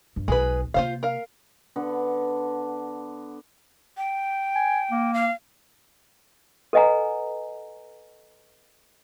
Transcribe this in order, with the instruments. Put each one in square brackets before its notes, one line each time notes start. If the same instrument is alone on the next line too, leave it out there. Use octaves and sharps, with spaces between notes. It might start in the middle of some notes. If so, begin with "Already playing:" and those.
[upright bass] G2
[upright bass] B1 [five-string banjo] G#3 G#4 B4
[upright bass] C3 A#3 [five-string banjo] F4 C5 F5
[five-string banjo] A#4 F5
[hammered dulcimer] D3 B3 D4
[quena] G5
[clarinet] G#5
A#3
[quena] F5
[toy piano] A4 B4 D#5 F#5 G#5 A#5